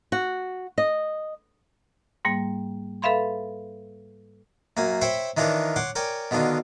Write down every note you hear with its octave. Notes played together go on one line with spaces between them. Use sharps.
F#4
D#5
G#2 G3 A#3
A4 B4 E5 F5 B5 C6
F#2 A#3 G#5
C5 C#5 E5 G5 B5 C#6
D#3 E3 D4 F4 A#4 C#5
C#5 F#5 C6 D6
A#4 C#5 D5 G5 G#5
B2 D3 D#3 F4